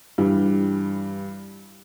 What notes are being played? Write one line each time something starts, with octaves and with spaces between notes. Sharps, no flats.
G2 E3 G3